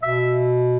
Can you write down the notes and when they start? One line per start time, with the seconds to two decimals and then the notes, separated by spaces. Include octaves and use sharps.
0.02 B2 E5